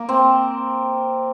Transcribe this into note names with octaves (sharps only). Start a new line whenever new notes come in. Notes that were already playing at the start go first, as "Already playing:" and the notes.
Already playing: A#3
C4